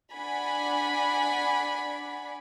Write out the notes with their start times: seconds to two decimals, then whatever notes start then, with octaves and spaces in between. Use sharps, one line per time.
0.14 D4 D5 F#5 G#5 B5